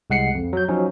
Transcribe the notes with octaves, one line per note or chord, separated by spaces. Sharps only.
C2 G#3 F#5 C7 C#7
F2
F#3 G6
F3 F#3 C#4 D#4